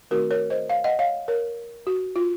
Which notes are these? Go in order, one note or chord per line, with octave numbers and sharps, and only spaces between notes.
D#3 A3 C4 D#4 F#4 A#4
A#4 C#5
C5 D#5
C#5 F5
D#5 F#5
C#5 F5
A#4 C#5
F#4
F4